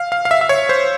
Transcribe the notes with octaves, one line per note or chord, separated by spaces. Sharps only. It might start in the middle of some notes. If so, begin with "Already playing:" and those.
Already playing: F5
F5
F5
E5
E5
C#5
C5